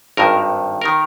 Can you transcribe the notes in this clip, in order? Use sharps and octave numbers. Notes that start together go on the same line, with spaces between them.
G#1 G2 D#3 A#4
D#3 A#4